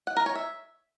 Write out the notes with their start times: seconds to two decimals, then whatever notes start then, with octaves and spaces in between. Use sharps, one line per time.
0.07 F#5
0.17 A#4
0.26 C#5
0.35 E5